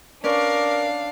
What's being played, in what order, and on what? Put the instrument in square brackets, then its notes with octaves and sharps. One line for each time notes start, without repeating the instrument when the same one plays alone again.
[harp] C#4 B4 D5 [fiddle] D4 F5 [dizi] A#4